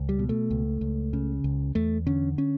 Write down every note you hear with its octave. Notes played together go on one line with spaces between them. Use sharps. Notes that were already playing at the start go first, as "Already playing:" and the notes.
Already playing: C#2
G3
B2
A3
C#2
C#2
C#3
C#2
E2 A3
D3 C#4
C#4